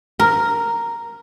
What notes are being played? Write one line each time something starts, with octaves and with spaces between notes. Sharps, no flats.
A#4